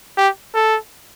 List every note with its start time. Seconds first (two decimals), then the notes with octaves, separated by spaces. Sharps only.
0.17 G4
0.54 A4